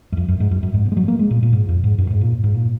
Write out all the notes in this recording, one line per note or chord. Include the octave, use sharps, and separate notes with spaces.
F#2
F2
F#2
G#2
F#2
F#2
G#2
A#2
G#3
F#3
A#3
G#3
A#2
A#2
G#2
F2
G#2
F#2
G#2
A#2
G#2
A#2